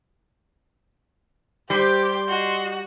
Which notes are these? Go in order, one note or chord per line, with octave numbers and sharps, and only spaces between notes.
G3 G4 C5 C6
F#4 D#5